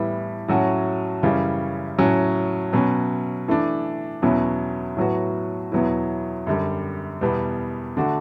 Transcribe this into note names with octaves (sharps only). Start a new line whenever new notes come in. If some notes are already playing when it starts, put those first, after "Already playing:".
Already playing: A2 E3 G3 B3 E4
A2 F#3 C#4 F#4
F#2 C#3 E3 G3 C#4
A2 F#3 C#4
B2 F#3 C#4
E3 A3 D4
E2 B2 F#3 C#4 E4
A2 F#3 B3 F#4
E2 B2 F#3 B3 E4
F#2 D3 G3
E2 B2 G3 B3
D3 A3 D4 F#4